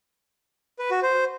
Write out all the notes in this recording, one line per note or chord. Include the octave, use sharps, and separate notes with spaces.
B4
F#4
C5